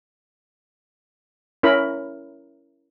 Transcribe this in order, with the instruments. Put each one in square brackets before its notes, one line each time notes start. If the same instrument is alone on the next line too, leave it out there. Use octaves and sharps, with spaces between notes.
[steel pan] C#4 E4 A#4 B5